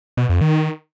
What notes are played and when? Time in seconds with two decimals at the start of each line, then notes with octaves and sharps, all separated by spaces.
0.17 B2
0.29 F2
0.41 D#3